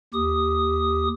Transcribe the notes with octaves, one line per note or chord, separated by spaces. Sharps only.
D#2 G4 D#6